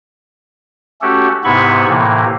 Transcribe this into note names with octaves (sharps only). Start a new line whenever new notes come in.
A3 C#4 F#4 G4 A4
G#2 C3 B3 E4 B5 C#6
A2 C3 E3 A#3